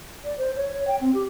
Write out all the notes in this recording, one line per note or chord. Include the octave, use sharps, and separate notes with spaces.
D5
C5
C#5
C#5
G5
C4
G4